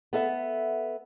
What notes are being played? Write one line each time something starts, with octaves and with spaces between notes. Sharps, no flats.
B3 A4 E5